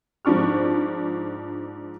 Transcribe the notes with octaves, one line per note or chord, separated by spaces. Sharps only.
G#2 F3 D4 C#6 F6